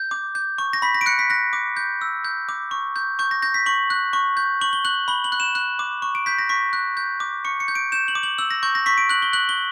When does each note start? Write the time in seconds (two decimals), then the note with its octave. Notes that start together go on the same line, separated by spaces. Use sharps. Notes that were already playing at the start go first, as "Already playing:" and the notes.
Already playing: G6
0.11 D6
0.35 G6
0.58 C#6
0.73 A#6
0.82 B5 B6
0.94 A#6
1.01 D7
1.06 F#6 C#7
1.19 B6
1.30 F#6 A#6
1.53 D6
1.77 G6
2.01 E6
2.25 G6
2.49 D6
2.71 C#6
2.96 G6
3.19 C#6 G6
3.31 A#6
3.42 G6 A#6
3.54 B6
3.66 C#6 F#7
3.90 F#6
4.13 C#6
4.37 G6
4.61 C#6 F#7
4.73 G7
4.85 F#6 F#7
5.08 B5 G7
5.24 F#7
5.32 F#6
5.40 E7
5.55 F#6
5.79 D6
6.02 C#6
6.15 D7
6.26 G6 B6
6.39 A#6
6.49 C#6 B6
6.73 F#6
6.97 G6
7.20 D6
7.45 C#6 C#7
7.60 C#7
7.68 G6
7.75 D7
7.92 G6 E7
8.08 F#7
8.15 D6
8.23 F#7
8.38 E6 F#7
8.51 A#6
8.63 C#6 G6
8.75 A#6
8.86 C#6 B6
8.98 D7
9.09 F#6 F#7
9.22 G7
9.33 F#6 F#7
9.49 G7